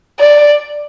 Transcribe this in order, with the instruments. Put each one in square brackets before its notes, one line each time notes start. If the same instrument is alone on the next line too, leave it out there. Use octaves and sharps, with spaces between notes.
[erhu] D5